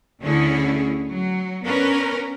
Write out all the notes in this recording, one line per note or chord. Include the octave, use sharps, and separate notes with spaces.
D2 D3 C#4 E4 G#4 C#5
F#3
B3 C#4 D4 A#4 B4